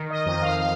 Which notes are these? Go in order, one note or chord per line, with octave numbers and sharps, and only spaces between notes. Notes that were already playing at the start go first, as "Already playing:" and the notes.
Already playing: D#3
D#5
F2 D#5
F5
F5